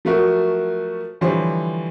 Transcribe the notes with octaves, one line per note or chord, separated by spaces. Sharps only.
F3 F#3 A3 F#4 A#4 E5
D3 E3 F3 G3 C5 C#5